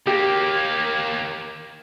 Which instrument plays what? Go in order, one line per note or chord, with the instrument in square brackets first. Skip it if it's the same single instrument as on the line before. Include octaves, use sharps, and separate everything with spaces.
[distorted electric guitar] D#2 A#3 [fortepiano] G4